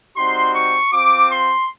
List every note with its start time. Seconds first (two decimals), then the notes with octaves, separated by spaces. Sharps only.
0.16 G3 C4 D#4 F#4 C6
0.54 C#6
0.92 C4 F4 D6
1.30 C6